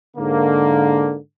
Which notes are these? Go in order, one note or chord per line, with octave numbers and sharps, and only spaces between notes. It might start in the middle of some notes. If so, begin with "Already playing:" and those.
G#2 D3 A#3